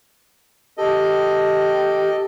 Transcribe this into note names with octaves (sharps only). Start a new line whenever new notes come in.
G4 A4 D#5